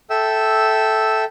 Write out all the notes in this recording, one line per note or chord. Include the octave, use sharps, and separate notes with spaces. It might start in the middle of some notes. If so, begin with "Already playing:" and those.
A4 E5 G5 E6